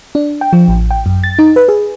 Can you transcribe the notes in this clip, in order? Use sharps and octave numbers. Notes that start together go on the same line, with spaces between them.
D4
G5
F3
A1
G5
F#2
A6
D#4
B4
G#4